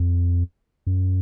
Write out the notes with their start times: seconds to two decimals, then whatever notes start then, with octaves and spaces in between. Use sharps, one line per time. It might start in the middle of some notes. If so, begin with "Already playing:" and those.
Already playing: F2
0.87 F#2